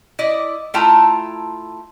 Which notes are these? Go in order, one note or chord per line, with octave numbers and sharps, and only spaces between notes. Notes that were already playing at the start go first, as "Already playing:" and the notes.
E4 D5 D#5
A3 E4 F4 G5 A5 A#5